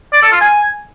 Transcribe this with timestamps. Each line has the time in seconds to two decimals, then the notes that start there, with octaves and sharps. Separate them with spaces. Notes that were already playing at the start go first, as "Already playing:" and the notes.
0.13 D5
0.23 A4
0.32 F4
0.41 G#5